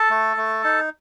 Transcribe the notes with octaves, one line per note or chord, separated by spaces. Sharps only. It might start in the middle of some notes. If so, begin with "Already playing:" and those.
Already playing: A4 A5
A3
A3
D#4